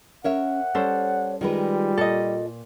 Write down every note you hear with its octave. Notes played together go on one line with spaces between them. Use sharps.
C#4 A#4 C#5 E5 F#5
G3 C#4 A4 C5 C#5
D#3 G3 G#3 F4 B4
A#2 A4 D#5